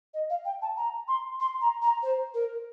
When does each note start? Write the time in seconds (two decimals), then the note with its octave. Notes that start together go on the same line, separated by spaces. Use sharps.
0.14 D#5
0.30 F5
0.45 G5
0.62 A5
0.77 A#5
1.08 C6
1.40 C6
1.61 A#5
1.82 A#5
2.03 C5
2.34 A#4